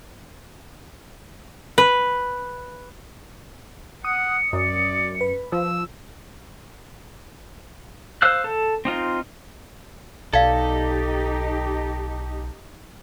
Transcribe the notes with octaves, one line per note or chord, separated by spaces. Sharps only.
B4
F#5 D#6 C#7
F#2 D5
B4
F3 E6
C5 F5 E6 F#6
A4
C4 D#4 F4
B1 D#4 G4 A4 D5 F5